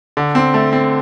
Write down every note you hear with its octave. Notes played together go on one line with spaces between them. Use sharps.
D3
C4
A3
C4